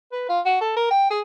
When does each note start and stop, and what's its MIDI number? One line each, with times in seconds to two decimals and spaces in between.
0.12 0.27 71
0.29 0.40 65
0.46 0.60 66
0.61 0.74 69
0.76 0.90 70
0.91 1.06 79
1.10 1.20 68